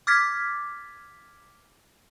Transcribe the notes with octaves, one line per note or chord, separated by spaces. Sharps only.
D6 F6 G#6 A6 B6